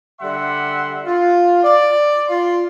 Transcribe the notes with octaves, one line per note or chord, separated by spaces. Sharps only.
D3 G3 E5 F#5 C6
F4
D5
F4 C6